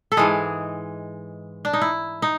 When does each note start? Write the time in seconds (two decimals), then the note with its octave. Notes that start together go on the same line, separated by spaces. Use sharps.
0.12 A4
0.17 G#2 E3 G#3 G#4
1.65 D4
1.73 D#4
1.82 E4
2.22 D#4